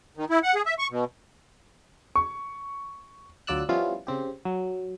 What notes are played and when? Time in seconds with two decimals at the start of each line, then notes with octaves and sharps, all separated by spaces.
0.17 D#3
0.30 E4
0.43 F#5
0.55 G#4
0.66 E5
0.79 C#6
0.90 B2
2.16 C#6
3.47 D2 F#3 F4 D5 E6 F#6
3.69 F3 G3 B3 C#4 E4 F4
4.07 C#3 C4 G4
4.45 F#3